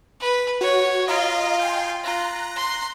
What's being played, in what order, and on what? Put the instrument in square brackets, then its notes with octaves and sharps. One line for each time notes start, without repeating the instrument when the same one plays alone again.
[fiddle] B4
[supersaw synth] F#4 [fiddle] C#5
[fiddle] F4 [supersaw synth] D#5 F5 A#5
[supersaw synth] G5 G#5 C6
[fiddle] F4 [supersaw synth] A#5 F#6 A#6
[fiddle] C6